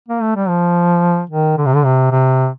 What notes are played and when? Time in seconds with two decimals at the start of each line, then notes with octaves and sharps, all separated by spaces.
0.08 A#3
0.21 A3
0.36 G3
0.49 F3
1.30 D#3
1.58 D3
1.66 C3
1.75 D3
1.85 C3
2.11 C3